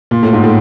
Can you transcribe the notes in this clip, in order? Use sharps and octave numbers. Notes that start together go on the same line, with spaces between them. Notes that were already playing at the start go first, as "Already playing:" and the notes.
A#2
A2
G#2
A2